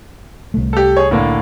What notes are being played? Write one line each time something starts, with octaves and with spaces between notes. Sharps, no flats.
C2 A3
G4 A4
G#4 C#5
A2 D3 A#3